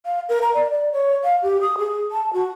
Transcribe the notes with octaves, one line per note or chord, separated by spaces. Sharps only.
F5
A#4
A#5
D5
D5
C#5
F5
G4
D#6
G#4
A5
F#4